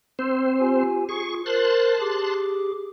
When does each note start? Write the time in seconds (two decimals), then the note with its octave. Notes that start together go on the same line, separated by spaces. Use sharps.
0.19 C4 C5
0.60 F4 G4 G#5
1.09 F4 G#4 C#6
1.46 A#4 C5 A5 C6 F#6
2.00 G4 G#4 D6